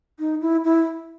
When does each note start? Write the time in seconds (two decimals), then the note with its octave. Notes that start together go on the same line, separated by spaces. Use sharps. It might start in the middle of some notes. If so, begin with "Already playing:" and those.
0.20 D#4
0.41 E4
0.64 E4